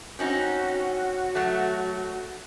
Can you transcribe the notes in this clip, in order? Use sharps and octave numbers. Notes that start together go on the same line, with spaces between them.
C4 C#4 D#4 F#4
F#3 A3